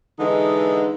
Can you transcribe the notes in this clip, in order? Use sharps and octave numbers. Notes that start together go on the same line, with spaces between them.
D3 E3 G#3 D#4